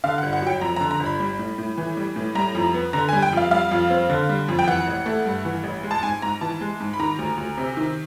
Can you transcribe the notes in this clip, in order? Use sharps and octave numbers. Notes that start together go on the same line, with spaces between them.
D3 F5
F#5
G1
F#5
F#3 G5
F2 A#5
D3 A#5
A#5
G1
B5
G3
A2
A2
E3
G3
A2
G3 A#5
F2
B3
D3 A#5
G3 G#5
G5
F2 F5
G3 F5
F2
C4
D3
G3
F2
G5
E3 F#5
A1
A3
G2
E3
A1
G#3
A5
G#2 G#5
G#2 A#5
E3 A5
G#3
G#2
B5
D#3 A#5
D2
D2
C3
D#3